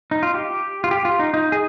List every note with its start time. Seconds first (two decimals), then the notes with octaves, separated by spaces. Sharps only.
0.11 D#4
0.23 F4
0.34 G4
0.84 F4
0.91 G4
1.05 F4
1.19 D#4
1.34 D#4
1.52 G#4